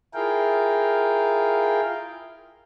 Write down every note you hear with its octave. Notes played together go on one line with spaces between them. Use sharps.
E4 F4 G#4 A#4 F5 G5